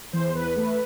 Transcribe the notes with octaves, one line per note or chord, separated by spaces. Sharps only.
E2 C5
E2 B4
A3 B4